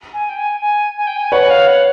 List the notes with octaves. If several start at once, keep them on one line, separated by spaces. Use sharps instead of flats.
G#5
G5
G#5
G#5
G#5
G5
G#5
B4 C#5 F#5
F5
F#5